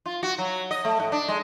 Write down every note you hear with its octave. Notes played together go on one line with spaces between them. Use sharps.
F4
F#4
F#3
D#5
A3
A2
D4
G#3